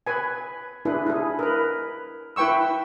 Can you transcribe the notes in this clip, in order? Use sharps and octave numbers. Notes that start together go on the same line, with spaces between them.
B4 G#5
D4 E4 G#4 B4
E4 G#4
A#4 B4
E4 B4 G5 C#6 E6